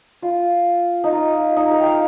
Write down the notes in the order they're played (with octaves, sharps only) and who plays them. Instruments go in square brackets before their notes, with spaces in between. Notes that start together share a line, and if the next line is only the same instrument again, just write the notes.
[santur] F4
D#4
F4
D#4
A#4
G5
F5